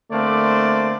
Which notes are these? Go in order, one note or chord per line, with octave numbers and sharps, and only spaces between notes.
D3 A3 A#3 C4 C5 D5